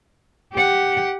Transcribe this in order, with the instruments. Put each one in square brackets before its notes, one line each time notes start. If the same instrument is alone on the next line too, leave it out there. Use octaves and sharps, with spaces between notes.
[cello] G4 F#5